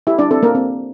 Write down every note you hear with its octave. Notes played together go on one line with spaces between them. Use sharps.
E4 G4 E5
D4 D5
C4 A4
A#3 A#4
C4